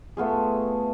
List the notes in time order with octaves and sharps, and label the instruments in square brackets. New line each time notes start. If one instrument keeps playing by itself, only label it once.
[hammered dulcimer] A3 B3 F4 G#4